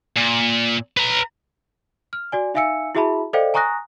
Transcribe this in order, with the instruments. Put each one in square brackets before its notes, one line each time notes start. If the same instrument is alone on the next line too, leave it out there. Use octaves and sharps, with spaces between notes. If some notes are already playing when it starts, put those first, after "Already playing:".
[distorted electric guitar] A#2
B4 A#5
[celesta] F6
F#4 D5 G#5
D#4 E5 F5 G#5 E6 C#7
E4 F#4 G#4 E5 A5 B5
A4 C5 D5 D#5 F5 G5
G#5 A#5 C#6 D#6 F#6 A#6